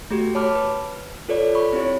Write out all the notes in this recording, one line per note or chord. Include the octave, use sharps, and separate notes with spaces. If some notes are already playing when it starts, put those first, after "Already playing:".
A3 F#4 G4
C#5 A5 B5 D6 F6
B4
F4 A4 B4 C#5 D5
B5 C#6
C4 E4 G4 C#5